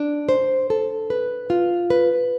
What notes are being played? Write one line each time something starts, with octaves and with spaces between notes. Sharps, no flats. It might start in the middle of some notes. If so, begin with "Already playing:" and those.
Already playing: D4
C5
A4
B4
F4
B4